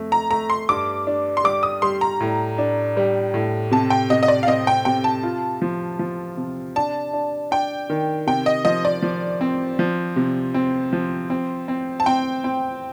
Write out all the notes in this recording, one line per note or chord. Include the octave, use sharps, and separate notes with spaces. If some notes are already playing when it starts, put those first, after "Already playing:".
Already playing: F2 A3
A#5
A3 A#5
C6
G2 D6
D4
C6
G3 D6
D#6
G3 C6
A#5
A2
D4
G3
A2
C3 A5
G5
C3 D#5
D#5
D5
F5
C4 D#5
G5
C3 G5
A5
F4
F3
F3
C3
D4 A5
D4
D4 G5
D#3
C3 G5
D#5
F3 D#5
D5
F3
C4
F3
C3
C4
F3
C4
C4
A5
C4 G5
C4